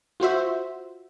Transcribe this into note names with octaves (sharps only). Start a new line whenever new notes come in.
F4 F#4 C5 E5